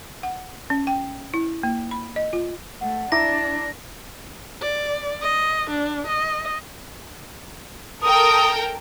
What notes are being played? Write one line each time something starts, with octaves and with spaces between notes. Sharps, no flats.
F#5
C#4
G5
E4
A#3
B5
D#5
F4
A3 F#5
D4 E4 E5 A#5 D6 A#6
D5
D#5
D4
D#5
A4 A#4 G5 D#6